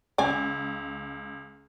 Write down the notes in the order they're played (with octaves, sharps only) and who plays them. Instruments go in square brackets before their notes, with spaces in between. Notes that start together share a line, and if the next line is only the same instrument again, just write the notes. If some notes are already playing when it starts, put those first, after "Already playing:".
[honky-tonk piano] C#2 [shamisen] D5 G#5